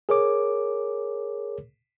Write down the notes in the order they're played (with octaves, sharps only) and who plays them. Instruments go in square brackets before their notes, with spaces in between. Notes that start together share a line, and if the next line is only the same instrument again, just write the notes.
[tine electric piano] G#4 A#4 C#5 D6